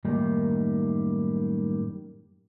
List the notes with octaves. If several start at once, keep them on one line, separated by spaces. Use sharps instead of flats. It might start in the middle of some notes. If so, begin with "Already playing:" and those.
F#2 A2 D#3 G3 A#3 D#4